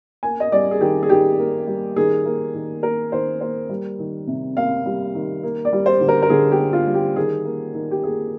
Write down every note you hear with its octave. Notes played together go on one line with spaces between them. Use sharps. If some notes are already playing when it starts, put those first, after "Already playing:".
A#3 G#5
D#5
G3 D5
G#4
D#3 G4
G#4
D#3 G4
A#3
G3
D#3 G#4
A#3
D#3
A#3 A#4
D#3 C5
A#3 C5
G3
D#3
C3
A#3 F5
G3
D#3
A#3
D5
G3
C5
D3
A#4
A#4
D3 G#4
G4
A#3
F4
G3
G4
D#3 G#4
A#3
D#3
G4
A#3 G#4